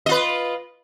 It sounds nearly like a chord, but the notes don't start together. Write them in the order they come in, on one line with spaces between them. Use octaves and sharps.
D#5 F4 B4